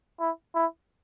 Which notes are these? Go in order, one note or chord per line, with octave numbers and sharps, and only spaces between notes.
E4
E4